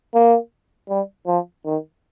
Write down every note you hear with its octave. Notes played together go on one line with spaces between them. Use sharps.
A#3
G3
F3
D#3